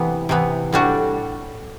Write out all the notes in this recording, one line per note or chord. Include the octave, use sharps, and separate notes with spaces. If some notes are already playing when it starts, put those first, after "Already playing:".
Already playing: C3 E3 B3
C3 E3 B3
A2 G3 D4 F#4